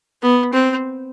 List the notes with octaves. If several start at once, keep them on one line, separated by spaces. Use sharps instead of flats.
B3
C4